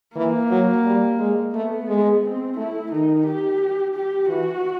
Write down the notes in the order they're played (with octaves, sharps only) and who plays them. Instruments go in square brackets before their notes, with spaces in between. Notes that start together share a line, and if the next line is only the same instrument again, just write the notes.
[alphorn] E3 [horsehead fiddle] A#3
[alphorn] F#3
G3
G#3
[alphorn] A3 [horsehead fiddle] B3
[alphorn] G#3
[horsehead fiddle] C4
[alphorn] A3 [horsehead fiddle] E4
[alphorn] D#3 [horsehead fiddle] D#4
[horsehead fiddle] G4
G4
[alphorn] E3 [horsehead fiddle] F#4